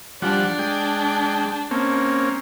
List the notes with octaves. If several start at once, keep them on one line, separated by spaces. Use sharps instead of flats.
F3 G3 D4 F#5
G#3 G5
A#3 C4 C#4